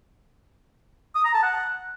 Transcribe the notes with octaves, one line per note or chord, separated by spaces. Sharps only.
D#6
A#5
A5
F#5